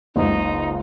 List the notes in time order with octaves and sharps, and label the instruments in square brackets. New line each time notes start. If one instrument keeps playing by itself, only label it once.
[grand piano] F#1 C#2 [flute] D#4